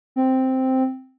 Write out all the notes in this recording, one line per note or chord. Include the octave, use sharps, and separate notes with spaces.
C4